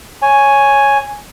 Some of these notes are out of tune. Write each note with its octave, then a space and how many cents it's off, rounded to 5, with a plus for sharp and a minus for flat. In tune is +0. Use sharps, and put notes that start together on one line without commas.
C#5 +0 G#5 +0